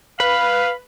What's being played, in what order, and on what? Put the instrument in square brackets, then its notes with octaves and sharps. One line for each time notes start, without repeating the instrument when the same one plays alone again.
[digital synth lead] B4 [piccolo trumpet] F5 [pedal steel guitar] B5